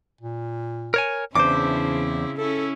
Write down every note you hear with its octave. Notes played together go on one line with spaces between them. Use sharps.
A#2
A#4 C#5 G#5
E2 C#3 C4 D4 E4 C5 D6
C#4 E4 A4